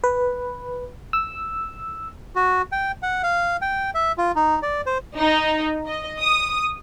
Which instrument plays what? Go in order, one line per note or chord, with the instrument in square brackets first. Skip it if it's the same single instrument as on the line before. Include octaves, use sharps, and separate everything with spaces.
[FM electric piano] B4
E6
[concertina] F#4
G5
F#5
F5
G5
E5
F4
D#4
D5
C5
[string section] D#4
D#5
D#6